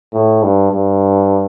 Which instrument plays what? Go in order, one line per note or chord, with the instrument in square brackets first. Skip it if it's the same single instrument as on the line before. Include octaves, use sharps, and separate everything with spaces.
[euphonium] A2
G2
G2